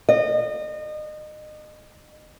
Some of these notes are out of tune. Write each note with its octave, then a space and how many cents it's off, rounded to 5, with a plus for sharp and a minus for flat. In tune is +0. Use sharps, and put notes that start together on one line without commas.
D#5 -30